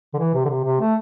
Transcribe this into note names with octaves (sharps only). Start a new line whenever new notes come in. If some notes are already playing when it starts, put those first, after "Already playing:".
D3
E3
C3
D3
C3
C3
A3